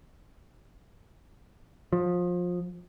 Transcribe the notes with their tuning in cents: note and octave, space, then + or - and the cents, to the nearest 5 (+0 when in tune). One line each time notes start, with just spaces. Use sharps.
F3 +25